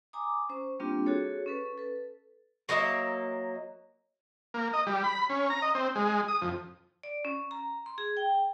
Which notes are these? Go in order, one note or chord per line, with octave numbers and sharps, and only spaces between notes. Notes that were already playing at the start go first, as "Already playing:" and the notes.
G#5 A#5 D6 D#6
C#4 C5
G3 A#3 C4 D4 F4 G4
F#4 G#4 A4 C#5
C#4 A4 B4
A4 B4
F#3 A#3 D#5 E5
A#3
D#5
G3
B5
C#4
A#5
D#5
C4
G#3
D#6
F2
D5
C#4
A#5
C6
G#4
G5